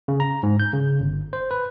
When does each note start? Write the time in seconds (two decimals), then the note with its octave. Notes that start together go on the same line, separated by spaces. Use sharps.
0.08 C#3
0.20 A#5
0.43 G#2
0.60 G6
0.73 C#3
1.00 G1
1.33 C5
1.51 B4